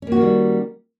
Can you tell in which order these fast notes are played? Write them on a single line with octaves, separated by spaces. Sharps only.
C#4 A#3 F#4 D#3 G3